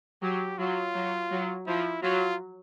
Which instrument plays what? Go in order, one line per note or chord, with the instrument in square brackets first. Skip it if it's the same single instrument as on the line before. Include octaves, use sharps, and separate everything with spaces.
[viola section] F#3 [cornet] G4
[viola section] F#3 [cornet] F4
[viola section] F#3
F#3
[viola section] F3 [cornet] E4
[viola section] F#3 [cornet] F4